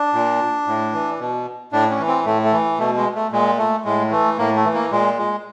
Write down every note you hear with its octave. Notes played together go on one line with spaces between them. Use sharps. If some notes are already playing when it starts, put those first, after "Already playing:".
Already playing: D4
A#2
A2
E3
B2
A2 D4
C#4
E3
C4
A2 A3
A3
E3
B2 A3
G#3
A3
A#2 G#3
A3
A2 G#3
E3 A3
A2 A#3
A3
E3
A#3
A#2 G#3
G#3